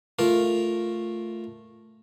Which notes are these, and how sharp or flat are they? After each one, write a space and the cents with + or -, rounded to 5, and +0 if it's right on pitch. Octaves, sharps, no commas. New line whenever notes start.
A3 +0 F4 +0 A#4 +0